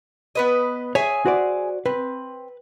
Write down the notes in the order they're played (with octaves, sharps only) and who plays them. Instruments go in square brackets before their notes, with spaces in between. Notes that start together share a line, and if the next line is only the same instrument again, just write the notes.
[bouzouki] B3 B4 D#5
[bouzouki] G#4 E5 G#5 [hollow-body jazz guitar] C#5
[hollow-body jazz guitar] F#4 C5 D5
[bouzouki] C4 [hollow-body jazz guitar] B4